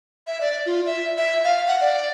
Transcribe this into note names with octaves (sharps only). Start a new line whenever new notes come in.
E5
D5
F4
E5
E5
F5
F#5
D5